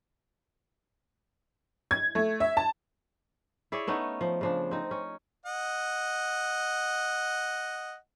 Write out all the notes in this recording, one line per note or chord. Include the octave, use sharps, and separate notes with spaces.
G#6
A3
E5
A5
E4 G#4 C#5 D5
A3 B3 C#4 D#4
F3
C#3 F3 D4
C4 D#4
C#4
D#5 F#5